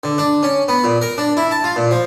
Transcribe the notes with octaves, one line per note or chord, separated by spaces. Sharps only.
D3
D4
C#4
B3
A#2
A#4
D4
E4
A5
F4
A#2
F3